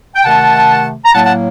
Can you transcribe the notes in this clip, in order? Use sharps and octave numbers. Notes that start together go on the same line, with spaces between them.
G5
C3 D#3 A3 F#5 A5
A#5
A2 F#3 A#3 F#5 A5
F#5 A5